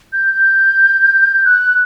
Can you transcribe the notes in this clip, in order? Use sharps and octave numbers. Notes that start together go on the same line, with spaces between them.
G6
F#6